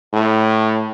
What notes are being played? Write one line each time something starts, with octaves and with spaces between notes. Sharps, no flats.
A2